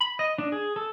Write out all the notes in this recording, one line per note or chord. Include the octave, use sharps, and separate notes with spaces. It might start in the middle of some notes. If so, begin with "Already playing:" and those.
B5
D#5
D4
G#4
A4